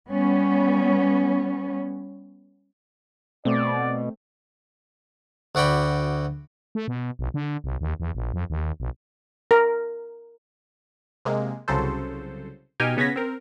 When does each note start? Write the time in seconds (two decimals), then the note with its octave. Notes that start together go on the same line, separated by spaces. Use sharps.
0.10 G3 B3 C#4
3.45 B2 A3 C4 D5
5.55 D2 F#4 D5 G5 B5
6.75 A3
6.88 B2
7.19 B1
7.34 D3
7.64 C2
7.81 D#2
8.00 E2
8.15 A#1
8.34 F2
8.50 D#2
8.80 B1
9.51 A#4
11.25 C3 G#3 A#3
11.68 C2 C#3 F#3 A4 C5
12.80 B2 D#4 G4 G5 G#5 F6
12.97 C#3 B3 C#4 G#6 A#6 B6
13.16 C4 A#4